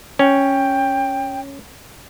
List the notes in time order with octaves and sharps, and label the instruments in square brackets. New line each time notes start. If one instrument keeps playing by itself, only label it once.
[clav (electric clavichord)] C#4 [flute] G5